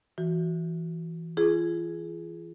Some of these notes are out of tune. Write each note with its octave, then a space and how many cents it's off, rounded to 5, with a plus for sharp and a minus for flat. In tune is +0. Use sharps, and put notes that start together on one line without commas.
E3 +5 F#4 -10
F4 -35 G#4 +15